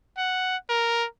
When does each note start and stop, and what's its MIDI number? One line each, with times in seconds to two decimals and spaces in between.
0.18 0.57 78
0.69 1.06 70